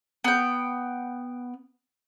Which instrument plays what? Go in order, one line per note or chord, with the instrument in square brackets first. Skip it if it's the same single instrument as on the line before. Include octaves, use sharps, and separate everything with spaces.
[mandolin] B3 G5